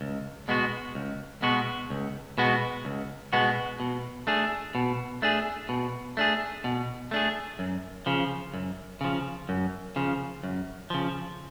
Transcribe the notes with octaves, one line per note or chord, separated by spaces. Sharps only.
C#2
B2 G#3 B3 F#4
C#2
B2 G#3 B3 F#4
C#2
B2 G#3 B3 F#4
C#2
B2 G#3 B3 F#4
B2
A3 D4 G#4
B2
A3 D4 G#4
B2
A3 D4 G#4
B2
A3 D4 G#4
F#2
C#3 F3
F#2
C#3 F3
F#2
C#3 F3
F#2
C#3 F3